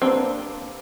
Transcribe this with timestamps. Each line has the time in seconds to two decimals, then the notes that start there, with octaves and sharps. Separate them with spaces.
0.02 A#3 C4 D4 G4 B4